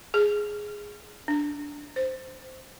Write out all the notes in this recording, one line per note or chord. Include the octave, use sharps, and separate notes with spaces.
G#4
D4
C5